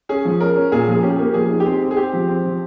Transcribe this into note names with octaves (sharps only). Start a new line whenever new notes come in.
C#4 G#4
F3
C#4 A#4
C#4
A#2 G#4
F3 G#4
C#4 G4
A#3
F3 G#4
D#4
G4
C4 G#4
C4
G#4
C4 G4
F3
C4
F3